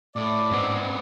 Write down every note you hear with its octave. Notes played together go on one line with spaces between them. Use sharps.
A2 D5
G#2 B3 C4